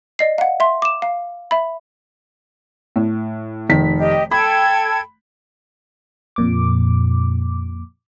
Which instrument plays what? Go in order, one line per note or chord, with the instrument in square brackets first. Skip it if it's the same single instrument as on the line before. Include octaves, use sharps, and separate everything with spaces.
[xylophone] D5 D#5 C7
F5 F#5
E5 C6
D6 E7
F5
E5 B5
[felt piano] A2
F1 D#3 B6
[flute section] G4 D#5
[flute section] A4 G5 G#6 [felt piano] B5
[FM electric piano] F2 A#2 D6